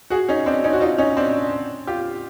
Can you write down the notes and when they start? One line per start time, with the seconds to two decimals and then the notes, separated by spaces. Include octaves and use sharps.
0.10 F#4 G#4
0.29 C#4 D#4
0.46 C4 D4
0.64 C#4 D#4
0.73 F#4
0.81 D#4 F4
0.98 C#4 D#4
1.17 C4 D4
1.87 F4 G4